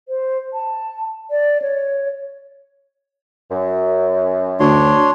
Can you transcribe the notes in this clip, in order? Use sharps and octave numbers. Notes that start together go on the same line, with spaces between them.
C5
A5
D5
C#5
F#2
D2 D4 C#5 C6